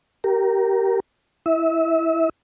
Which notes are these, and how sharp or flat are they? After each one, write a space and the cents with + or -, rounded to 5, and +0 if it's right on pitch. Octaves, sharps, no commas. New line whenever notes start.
G4 -20 A#4 +0
E4 +0 E5 -30